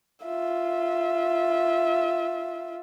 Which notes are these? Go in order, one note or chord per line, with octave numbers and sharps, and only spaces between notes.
F4 E5